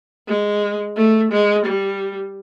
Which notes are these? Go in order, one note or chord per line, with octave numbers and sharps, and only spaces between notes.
G#3
A3
G#3
G3